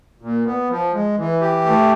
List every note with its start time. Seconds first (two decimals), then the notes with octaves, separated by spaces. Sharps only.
0.22 A#2
0.46 B3
0.70 F3
0.93 G#3
1.18 E3
1.41 G4
1.65 A3